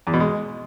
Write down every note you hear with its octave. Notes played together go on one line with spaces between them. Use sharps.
E2
B2
G#3